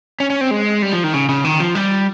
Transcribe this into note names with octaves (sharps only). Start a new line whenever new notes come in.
C#4
C#4
C4
G#3
G3
F3
D#3
C#3
C#3
D#3
F3
G3